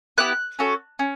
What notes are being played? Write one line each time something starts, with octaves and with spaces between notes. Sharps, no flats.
B3 E4 G4 F#6
C#4 F#4 A4
C#4